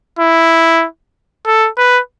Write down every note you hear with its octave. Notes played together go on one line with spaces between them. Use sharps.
E4
A4
B4